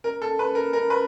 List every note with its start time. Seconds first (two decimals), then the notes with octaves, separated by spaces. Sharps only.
0.04 A#4
0.22 A4
0.39 B4
0.55 A#4
0.73 A#4
0.90 B4